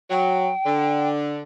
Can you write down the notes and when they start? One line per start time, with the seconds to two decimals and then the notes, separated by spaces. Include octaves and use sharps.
0.10 F#3 G5
0.66 D3